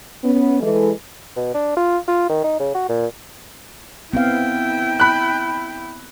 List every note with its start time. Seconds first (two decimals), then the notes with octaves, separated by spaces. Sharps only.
0.24 B3 C#4
0.60 E3 G#3 A4
1.36 B2
1.54 D4
1.77 F4
2.08 F4
2.29 D#3
2.44 D#4
2.59 C#3
2.74 F#4
2.89 A#2
4.13 B3 C4 E4 F5 G5
5.00 B5 F#6